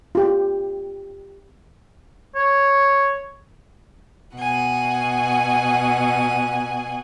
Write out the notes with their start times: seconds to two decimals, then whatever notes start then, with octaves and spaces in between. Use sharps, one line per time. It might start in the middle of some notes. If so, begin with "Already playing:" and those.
0.15 F4 G4
2.35 C#5
4.35 B2 F#5 G#5